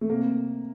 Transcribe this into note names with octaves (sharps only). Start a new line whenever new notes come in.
A3
C3 A#3